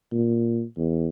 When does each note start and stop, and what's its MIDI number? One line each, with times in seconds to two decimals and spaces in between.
0.12 0.63 46
0.77 1.08 40